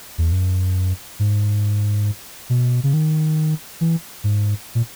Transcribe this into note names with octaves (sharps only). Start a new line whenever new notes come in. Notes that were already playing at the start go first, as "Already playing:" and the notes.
E2
F#2
G#2
B2
C#3
D#3
E3
G#2
A#2